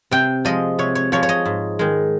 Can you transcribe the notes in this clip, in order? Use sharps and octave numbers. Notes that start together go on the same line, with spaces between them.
C3 G5
F3 G#3 D#5
C3 C#5
C#5
F3 G#3 C#5
C#5
D#5
G#2
D#3 G#3